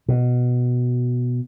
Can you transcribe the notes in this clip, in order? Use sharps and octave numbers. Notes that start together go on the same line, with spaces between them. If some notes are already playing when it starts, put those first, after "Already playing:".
B2